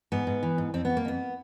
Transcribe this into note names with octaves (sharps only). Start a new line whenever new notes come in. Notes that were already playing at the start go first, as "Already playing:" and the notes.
G#2 B3
G#2
E3
G#2
F2 C4
F2 B3
A#3
F2 B3